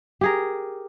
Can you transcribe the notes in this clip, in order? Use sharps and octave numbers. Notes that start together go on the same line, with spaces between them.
G4 G#4 A#4